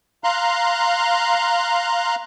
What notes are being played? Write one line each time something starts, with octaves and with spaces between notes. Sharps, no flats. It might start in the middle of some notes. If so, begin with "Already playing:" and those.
F5 A#5 C6 F#6